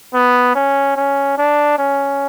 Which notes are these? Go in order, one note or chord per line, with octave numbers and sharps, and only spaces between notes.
B3
C#4
C#4
D4
C#4